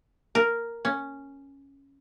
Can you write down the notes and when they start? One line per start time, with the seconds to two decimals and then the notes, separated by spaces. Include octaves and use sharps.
0.35 A#4
0.85 C#4